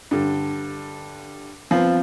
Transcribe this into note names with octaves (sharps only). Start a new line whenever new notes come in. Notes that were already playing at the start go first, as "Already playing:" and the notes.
G2 D3
F3 B3 C4